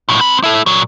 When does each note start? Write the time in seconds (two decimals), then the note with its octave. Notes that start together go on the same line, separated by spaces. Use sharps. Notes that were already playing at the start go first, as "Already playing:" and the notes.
0.09 B1 A2
0.21 C4 B5
0.43 E4 A4
0.66 A#2 F#3